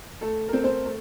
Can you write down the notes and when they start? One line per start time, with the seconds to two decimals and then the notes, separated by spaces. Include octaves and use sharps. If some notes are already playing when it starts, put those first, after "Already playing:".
0.21 A3 A4
0.49 A#4
0.53 C4 C5
0.64 C4 C5
0.85 A3